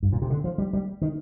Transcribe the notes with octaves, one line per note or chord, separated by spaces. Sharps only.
G2
A#2
C3
D3
F3
G3
G3
D#3